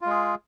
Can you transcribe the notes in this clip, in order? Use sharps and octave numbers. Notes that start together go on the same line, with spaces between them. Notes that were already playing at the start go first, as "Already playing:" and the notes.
G#3 F4 G#4